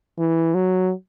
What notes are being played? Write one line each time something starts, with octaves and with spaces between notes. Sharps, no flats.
E3
F#3